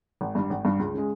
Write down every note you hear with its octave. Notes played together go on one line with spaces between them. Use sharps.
G#1
G2 G3
G#1
G2 G3
C#2
C#3 G#3